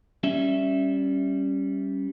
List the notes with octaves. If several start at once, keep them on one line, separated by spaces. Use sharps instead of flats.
G3 C#4 E5